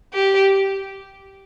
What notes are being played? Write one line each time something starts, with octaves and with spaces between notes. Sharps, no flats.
G4